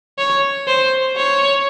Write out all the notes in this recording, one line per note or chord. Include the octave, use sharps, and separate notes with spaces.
C#5
C5
C#5